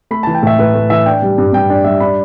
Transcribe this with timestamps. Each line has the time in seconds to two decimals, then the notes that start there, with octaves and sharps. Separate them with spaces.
0.11 A3 B5
0.23 E3 A5
0.34 G5
0.43 A2 E5
0.59 A2 B4
0.74 A3
0.90 E3 E5
1.06 D4 G5
1.22 G3
1.38 G2
1.53 G2 G5
1.70 D4
1.85 G3 E5
2.00 D4 B5